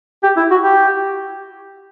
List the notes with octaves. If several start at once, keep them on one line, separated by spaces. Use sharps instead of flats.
G4
E4
F#4
G4